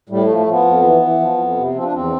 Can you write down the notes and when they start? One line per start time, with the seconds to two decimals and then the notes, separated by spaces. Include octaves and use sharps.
0.09 A2 G3
0.23 F3 A3
0.37 A3
0.46 F3
0.51 B3
0.65 F2
0.83 E3
1.02 E3
1.20 F3
1.38 F2
1.56 C3
1.74 F3 C4
1.84 D4
1.92 E2 C4